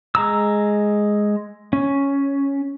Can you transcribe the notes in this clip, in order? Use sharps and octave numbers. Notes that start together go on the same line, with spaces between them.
G#3 A#5 E6
C#4